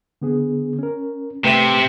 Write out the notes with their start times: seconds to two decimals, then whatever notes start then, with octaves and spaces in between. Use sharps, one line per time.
0.22 D3 B3 G#4
0.79 C#4 A#4
1.44 C3 A3 B4 E5